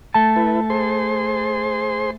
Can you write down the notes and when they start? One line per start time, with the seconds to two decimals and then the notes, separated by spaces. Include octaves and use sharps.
0.14 A3 A5
0.36 E4 B4
0.70 G#4 C5 C6